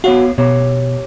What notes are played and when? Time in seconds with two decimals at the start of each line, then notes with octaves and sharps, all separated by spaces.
0.04 B3 F#4 C#5 F5
0.38 B2 G4 C#5